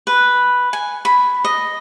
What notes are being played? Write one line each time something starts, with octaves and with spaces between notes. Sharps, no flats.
B4
G#5
B5
D#5